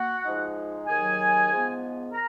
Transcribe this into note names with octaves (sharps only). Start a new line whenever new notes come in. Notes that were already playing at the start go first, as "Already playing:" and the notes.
Already playing: A#3 F#4 F#5
G#2 F3 G#3 D#4
D#2 D#3 F#3 G#4 G#5
G#2 F3 G#3 B3
A#4 A#5